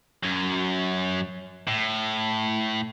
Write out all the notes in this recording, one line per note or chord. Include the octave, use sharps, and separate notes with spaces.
F#2 F#3
A2